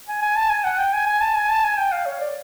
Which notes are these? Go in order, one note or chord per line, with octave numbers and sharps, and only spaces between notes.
G#5
G#5
A5
G#5
F#5
G5
G#5
G#5
A5
G#5
A5
G#5
G5
F5
C#5
D5